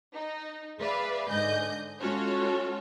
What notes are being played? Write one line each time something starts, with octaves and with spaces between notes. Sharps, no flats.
D#4
G#4 B4 D5 E5 F5
G#2 D3 D#5 G#5 G6
G#3 C#4 F4 F#4 A4 C#5